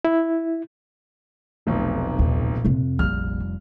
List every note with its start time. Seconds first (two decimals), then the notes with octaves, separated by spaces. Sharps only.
0.05 E4
1.67 F1 B1 F2 A3
2.19 D#2 A#2
2.65 F2 C3
2.99 F1 A#1 F3 G3 A#3 F6